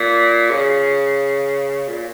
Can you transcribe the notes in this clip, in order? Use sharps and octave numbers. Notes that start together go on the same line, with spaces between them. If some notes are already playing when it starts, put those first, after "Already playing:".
Already playing: A#2
C#3
A#2